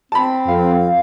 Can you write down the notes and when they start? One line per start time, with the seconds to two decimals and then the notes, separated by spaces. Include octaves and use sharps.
0.12 C4 A5 B5
0.48 F2 F5